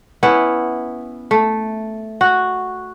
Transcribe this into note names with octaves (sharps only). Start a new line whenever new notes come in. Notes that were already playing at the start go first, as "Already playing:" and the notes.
B3 C#4 E4
A3
F#4